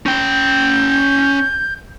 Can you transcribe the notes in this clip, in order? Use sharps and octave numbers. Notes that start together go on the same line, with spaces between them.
C#4 G5 G6